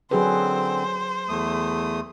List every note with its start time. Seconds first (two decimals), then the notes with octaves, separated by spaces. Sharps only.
0.11 D3 F#3 C4 G#4 B4 C5
1.29 E2 A3 D#6